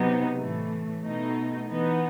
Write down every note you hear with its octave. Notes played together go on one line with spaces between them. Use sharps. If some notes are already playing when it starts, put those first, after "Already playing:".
Already playing: C3 F#3 B3 D#4
A2 E3 A3
B2 A3 D#4
E3 B3 D#4